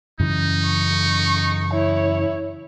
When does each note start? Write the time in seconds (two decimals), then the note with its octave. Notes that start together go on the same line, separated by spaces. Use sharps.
0.20 F#2 C#3 E3 D#4
0.65 C#6
1.72 E4 C#5